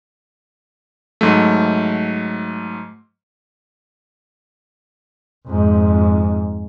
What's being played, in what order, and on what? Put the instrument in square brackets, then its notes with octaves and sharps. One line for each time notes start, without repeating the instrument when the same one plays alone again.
[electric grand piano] G#2 F#3 A3
[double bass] F2 G#2